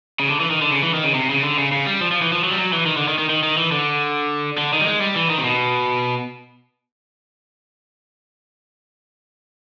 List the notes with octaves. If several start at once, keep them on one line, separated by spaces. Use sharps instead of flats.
C#3
D3
E3
D#3
D3
C#3
E3
D#3
C#3
C3
C#3
D3
C#3
C#3
G3
F3
F3
E3
F3
F#3
G3
F#3
E3
D#3
D3
D#3
D#3
D#3
D#3
E3
D3
D3
D#3
G3
G#3
G3
E3
D#3
C3
B2